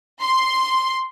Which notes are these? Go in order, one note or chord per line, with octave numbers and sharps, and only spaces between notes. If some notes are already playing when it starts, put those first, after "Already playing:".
C6